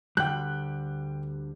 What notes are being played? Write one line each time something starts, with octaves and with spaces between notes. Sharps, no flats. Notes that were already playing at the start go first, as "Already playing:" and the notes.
D2 D3 G3 G5 F#6